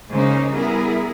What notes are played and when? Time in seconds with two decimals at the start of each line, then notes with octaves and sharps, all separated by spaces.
0.10 C#3 G#3 A#3 C#4 D#4 C5
0.52 G3 B3 E4 G#4 A#4